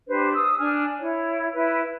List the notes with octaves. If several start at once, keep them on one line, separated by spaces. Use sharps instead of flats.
D4 G4 B4 C5
D#6 E6
D4 G#5 F6
E4 C#5
E4 B4